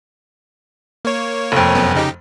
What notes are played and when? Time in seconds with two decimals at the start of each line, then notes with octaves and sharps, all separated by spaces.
1.05 A#3 C#5
1.52 F1 F2
1.75 F#2 B3 C#4
1.95 C#3 D#4 G4